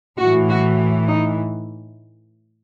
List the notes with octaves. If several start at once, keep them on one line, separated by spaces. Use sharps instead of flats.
A2 E3 F#4
F#4
D#4